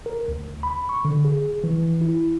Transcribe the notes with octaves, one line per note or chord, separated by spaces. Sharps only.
A#4
D2
B5
C#6
D3
G#4
E3
E4